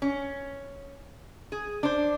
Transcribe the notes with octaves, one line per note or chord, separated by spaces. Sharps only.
C#4
G#4
D4 C5